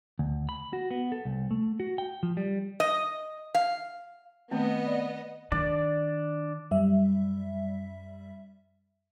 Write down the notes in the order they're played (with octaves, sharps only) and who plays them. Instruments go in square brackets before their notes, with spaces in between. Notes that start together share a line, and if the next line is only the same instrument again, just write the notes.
[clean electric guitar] D2
B5
F#4
B3
A4
C2
A3
F#4
G5
F3
G3
[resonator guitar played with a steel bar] D#5
F5
[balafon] D#3 A3 C4 [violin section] B3 D#5
[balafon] D5
[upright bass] D#3 [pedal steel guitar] D4 D5
[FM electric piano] F#2 G3 E5